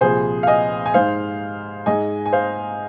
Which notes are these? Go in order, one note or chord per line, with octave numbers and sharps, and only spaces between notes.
C2 A#2 F3 G#4 C5
F5
D#5 G#5
G#5
G#2 G#3 D#4 C5 F5
G#2 G#3 D#4 D#5 G#5
G#5
C5 F5